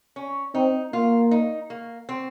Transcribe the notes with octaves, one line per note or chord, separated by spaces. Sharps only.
C#4
C4 D#4
A#3 F4
D#4
A#3
C4